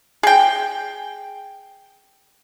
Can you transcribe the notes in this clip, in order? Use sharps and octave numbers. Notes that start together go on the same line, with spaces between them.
G#4 G5